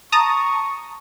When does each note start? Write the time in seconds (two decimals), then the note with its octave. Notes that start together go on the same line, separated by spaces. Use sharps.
0.12 A5 A#5 C#6 D#6